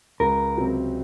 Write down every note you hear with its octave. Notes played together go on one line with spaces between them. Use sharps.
C#2 A#4
C3 F#3 C4